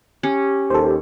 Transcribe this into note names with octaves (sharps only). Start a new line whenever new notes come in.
C#4 G4
D#2 A4 C5